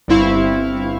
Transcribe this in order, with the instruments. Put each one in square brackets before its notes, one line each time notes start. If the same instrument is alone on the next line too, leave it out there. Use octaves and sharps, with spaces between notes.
[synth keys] G1 G2 C4 E4 F5 C#6